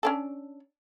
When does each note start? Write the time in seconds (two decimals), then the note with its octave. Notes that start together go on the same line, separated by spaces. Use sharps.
0.03 C#4 D4 A4